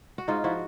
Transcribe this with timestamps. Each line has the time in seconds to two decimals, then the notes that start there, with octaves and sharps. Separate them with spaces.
0.18 F#4
0.28 G#2 D#4 F4
0.44 F3 E4 F#4